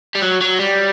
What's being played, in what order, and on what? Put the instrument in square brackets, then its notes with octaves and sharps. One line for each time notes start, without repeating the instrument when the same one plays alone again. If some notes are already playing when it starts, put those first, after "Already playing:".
[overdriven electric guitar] G3
F#3
F#3
G3